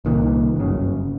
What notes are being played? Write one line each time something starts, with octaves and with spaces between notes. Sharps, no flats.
C2 A#2 D#3
G1 F#2 C#3